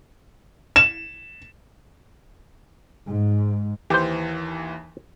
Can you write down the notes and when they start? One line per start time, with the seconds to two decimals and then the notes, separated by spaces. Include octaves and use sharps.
0.76 E7
3.07 G#2
3.90 D#2 E3 G4 C5